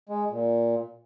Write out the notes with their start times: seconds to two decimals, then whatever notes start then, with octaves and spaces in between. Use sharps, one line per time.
0.09 G#3
0.31 A#2